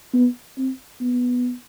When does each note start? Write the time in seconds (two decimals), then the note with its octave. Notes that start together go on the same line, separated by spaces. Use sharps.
0.14 B3
0.58 C4
1.01 B3